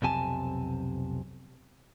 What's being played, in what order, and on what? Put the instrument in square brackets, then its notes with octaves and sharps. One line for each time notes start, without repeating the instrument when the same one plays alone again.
[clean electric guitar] B1 F2 C3 G#5 A5